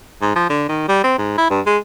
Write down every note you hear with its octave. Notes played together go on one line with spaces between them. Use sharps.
G#2
F3
D3
D#3
G3
C4
G#2
E4
G2
G#3